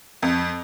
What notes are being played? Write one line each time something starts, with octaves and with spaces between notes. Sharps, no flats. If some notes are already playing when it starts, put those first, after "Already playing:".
F2